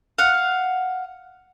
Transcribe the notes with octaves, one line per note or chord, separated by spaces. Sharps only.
F5 F#5